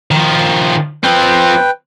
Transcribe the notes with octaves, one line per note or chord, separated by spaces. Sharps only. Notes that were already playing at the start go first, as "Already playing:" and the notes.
D#3 F3
F3 C4 B4 G5